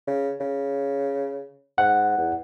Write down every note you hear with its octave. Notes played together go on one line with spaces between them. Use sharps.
C#3
C#3
G#2 F#5
E2